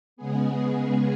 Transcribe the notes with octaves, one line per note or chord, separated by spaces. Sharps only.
C#3 G#3 B3 G#4